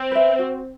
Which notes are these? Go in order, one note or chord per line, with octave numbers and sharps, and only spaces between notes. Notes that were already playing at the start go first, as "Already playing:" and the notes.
Already playing: C4
B4 E5
F#4